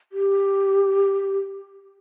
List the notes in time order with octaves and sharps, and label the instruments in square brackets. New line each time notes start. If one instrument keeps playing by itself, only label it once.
[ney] G4